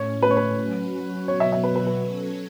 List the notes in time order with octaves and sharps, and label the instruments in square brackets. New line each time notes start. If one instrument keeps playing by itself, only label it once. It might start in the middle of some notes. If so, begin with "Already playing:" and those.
Already playing: [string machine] A2 A3 C#4 [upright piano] C#5
[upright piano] B4
C#5
B4
[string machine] F#3 C#4 F#4
[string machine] B2 F#3 B3 F#4 [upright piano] C#5
[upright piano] E5
E5
B4
B4
B4
[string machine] F#3 C#4 A4 C#5